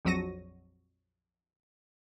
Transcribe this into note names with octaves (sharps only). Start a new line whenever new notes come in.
A#1 F2 F#3 F#4 A#6 D#7